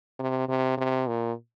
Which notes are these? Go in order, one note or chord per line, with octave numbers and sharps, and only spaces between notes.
C3
C3
C3
A#2